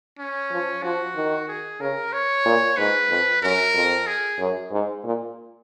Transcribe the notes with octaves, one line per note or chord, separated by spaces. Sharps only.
C#4
F3
F3 F#4
D#3
G#4
C#3 A#4
C#5
A#2
G#2 B4
F2
F#2 A#4
F2
G#4
F#2
G#2
A#2